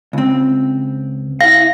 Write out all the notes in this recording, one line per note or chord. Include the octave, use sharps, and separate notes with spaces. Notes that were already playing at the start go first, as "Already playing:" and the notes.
C#2 C4
E4 F5 A#6